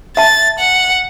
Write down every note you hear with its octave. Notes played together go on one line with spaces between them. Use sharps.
E5 A5 A6
F#5